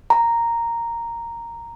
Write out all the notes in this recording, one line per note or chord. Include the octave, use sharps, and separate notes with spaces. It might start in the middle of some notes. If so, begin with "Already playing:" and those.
A#5